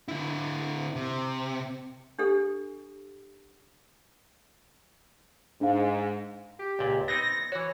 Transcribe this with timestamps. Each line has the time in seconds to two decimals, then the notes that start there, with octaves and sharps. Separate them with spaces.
0.08 D3 E4
0.96 C3
2.19 D4 G4 A4
5.61 G#2 D4 F5
6.59 G4
6.79 C#2 A#2
7.08 B3 C4 D#4 A#6
7.52 E3 F#4 C#5